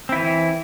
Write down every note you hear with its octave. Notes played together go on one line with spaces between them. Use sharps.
E3 C4 E4